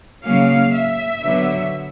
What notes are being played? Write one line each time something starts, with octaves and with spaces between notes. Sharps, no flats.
C#3 F#3 A#3 C#4 F5
E5
D3 F#3 B3